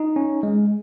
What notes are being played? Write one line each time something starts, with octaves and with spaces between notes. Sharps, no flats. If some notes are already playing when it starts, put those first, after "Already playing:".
Already playing: D#4
C#4
G#3